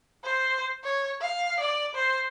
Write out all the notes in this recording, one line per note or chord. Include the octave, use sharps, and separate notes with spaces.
C5
C#5
F5
D5
C5